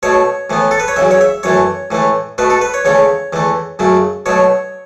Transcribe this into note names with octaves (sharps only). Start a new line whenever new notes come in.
B2 A3 C#5
A2 E3 B3
A4
B4
C#5
E2 C#3 F#3 E5
C#5
E5
F#2 E3 A3 C#5
A2 E3 A3
B2 A3 B4
A4
B4
C#5
E2 C#3 A3 C#5
E2 E3 A3
F#2 C#3 F#3 A3
B2 F#3 A3 C#5